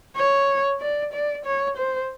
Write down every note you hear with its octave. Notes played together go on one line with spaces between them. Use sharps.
C#5
D5
D5
C#5
C5